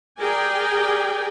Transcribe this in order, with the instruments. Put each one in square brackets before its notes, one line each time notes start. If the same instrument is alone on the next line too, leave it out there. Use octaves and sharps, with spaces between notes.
[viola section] G4 G#4 A#4 D5 G5 G#5